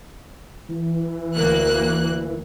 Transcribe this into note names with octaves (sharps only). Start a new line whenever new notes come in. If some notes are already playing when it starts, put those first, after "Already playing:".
E3
D2 A#3 F#6